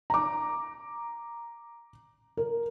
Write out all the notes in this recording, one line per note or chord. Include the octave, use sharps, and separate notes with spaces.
A#5 D6
A#4